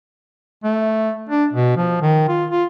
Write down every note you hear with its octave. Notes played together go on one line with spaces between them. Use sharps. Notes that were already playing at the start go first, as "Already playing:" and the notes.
A3
D4
B2
F3
D#3
F4
F4